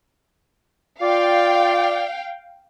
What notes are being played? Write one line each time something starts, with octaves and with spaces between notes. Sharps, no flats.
F4 D5 F5 G5